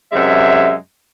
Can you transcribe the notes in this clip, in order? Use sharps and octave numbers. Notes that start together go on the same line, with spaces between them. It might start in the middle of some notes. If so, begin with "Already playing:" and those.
F#2 C3 G#3 E5